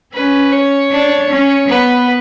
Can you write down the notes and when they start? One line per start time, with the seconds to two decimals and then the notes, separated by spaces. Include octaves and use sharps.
0.13 C#4 B4
0.52 C#5
0.91 D4
1.30 C#4
1.68 B3 B4